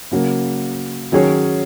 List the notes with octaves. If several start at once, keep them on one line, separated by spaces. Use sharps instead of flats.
C#3 F#3 A#3
D#3 F#3 C#4 G#4 C#5